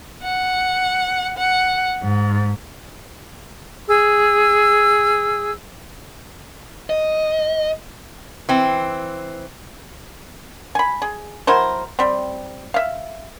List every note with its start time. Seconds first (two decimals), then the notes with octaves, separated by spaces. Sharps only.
0.23 F#5
1.39 F#5
2.03 G#2
3.87 G#4 E6
6.90 D#5
8.49 E3 C4
10.75 G#5 B5
11.02 G#4
11.47 F#3 E4 A#4 C5
11.99 G3 C4
12.74 E5 F5